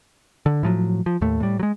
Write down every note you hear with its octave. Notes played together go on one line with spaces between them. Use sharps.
D3
A2 F3 F#3
F3
D#2 A2 A3
A2 G3
F#3 G#3